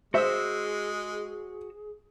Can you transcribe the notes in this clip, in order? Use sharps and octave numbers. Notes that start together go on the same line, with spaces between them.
G#3 F#4 G#4 C5 E5 E6